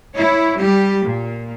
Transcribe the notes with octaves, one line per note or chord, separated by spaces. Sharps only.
E4 C#5
G3 G4
A#2